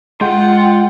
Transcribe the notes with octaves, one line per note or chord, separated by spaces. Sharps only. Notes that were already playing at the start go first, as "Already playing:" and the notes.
G#3 F4 F#5 G5 C6